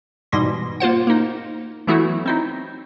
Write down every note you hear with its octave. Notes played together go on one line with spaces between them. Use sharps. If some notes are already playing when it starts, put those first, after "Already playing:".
G#2 B2 E3 G3 C6 A#6
A#3 F4 C5 F#5
A#3 D#4
E3 F#3 A3 B3 E4 F#4
C4 D#4 E4